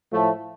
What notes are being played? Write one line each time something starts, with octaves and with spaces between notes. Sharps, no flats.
A2 F3 A3